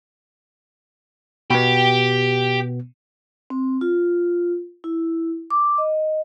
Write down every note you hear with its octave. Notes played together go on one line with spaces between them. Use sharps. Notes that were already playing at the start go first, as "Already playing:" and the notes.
B2 B3 G4
C4
F4
E4
D6
D#5